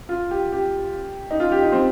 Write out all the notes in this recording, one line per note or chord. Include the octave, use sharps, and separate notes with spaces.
F4
G4
G4
D#4
F4
G4
D#4
C4